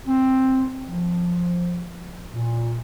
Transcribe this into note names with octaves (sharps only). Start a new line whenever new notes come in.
C4
F3
A#2